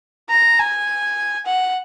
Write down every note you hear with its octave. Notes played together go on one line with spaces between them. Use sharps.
A#5
G#5
F#5